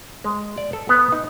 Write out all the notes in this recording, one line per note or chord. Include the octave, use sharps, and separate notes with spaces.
G#3
D5
A4
B3
D#4